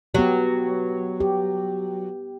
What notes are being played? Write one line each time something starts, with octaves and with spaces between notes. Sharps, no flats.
F#3 B3 G4
G4